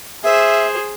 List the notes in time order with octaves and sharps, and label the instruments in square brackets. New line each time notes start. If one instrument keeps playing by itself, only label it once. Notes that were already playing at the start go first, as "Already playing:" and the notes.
[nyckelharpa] G#4 C5 [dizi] E5